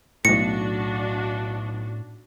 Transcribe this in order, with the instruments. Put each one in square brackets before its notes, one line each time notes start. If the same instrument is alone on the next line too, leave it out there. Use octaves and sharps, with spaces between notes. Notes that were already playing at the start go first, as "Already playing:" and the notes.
[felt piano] B1 A#6 [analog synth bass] A2 [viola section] D4 F#4 [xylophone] C#7